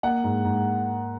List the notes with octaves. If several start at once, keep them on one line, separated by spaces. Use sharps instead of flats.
A#3 F#5
G#2
G#2